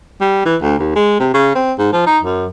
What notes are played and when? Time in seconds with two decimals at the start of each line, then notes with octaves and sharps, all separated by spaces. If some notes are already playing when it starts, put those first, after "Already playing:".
0.21 G3
0.46 E3
0.62 D2
0.79 D#2
0.96 G#3
1.20 C3
1.34 C#3
1.55 C4
1.79 G#2
1.93 F3
2.06 D#4
2.23 F#2